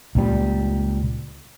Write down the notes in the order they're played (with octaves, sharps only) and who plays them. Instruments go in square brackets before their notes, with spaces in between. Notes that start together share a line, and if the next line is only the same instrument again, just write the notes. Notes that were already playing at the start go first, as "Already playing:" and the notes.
[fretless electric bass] C#2 A#2 G3